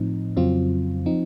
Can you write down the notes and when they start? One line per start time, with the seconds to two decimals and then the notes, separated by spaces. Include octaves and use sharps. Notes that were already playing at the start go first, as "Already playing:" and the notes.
Already playing: A2 F3 C4 D#4
0.36 F2 C#3 F#3 C4 F4
1.06 F3 C4 D#4